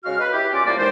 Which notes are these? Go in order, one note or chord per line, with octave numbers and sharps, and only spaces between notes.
C#3 G#3 F#4 F5 F6
B4
E4 G4
F#2 C#4 F4 D5 D6
C2 A#3 D5
D#3 E3 G#3 C5